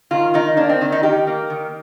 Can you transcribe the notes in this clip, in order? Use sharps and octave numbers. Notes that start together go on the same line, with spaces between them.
D#3 F4
D#3 D#4
A#3 D4
C4
D#3
D#4
D#3 G4
A#3
D#3